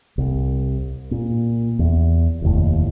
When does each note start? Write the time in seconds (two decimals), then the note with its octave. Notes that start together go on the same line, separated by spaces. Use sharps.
0.18 C2
1.11 A#2
1.79 E2
2.42 F1 D#2 A2